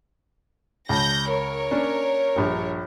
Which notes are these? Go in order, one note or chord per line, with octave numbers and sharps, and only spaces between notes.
C#2 A5 G6 A#6
A#4 C#5
A#3 C#4 D4
A#1 G2